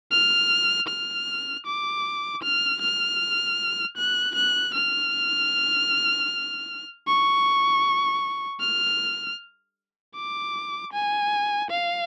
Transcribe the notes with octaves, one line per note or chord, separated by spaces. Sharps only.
F6
F6
D6
F6
F6
F#6
F#6
F6
C#6
F6
D6
G#5
F5